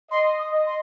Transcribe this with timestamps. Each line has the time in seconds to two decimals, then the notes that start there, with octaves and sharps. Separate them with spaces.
0.11 D#5 C6
0.39 D#6
0.52 D#5
0.66 C6